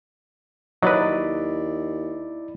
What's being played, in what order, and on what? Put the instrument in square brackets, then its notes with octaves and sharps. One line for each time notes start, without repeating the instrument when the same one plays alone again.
[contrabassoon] D#2 [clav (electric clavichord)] F#3 B4 [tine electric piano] E4 D5 [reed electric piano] D#5